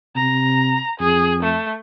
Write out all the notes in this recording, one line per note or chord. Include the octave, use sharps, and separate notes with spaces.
C3 A#5
F2 G#4
A3